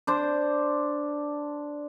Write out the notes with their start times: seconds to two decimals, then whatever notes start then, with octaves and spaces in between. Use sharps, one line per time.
0.07 D4 C5